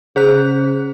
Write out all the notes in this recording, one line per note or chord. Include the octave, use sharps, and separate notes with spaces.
C#3 G#4 C5 F#6